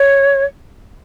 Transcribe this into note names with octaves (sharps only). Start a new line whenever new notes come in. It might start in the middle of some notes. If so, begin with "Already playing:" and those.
Already playing: C#5